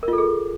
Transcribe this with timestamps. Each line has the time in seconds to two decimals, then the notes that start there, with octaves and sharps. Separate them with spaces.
0.03 A#4
0.08 F4
0.13 A4
0.18 G#4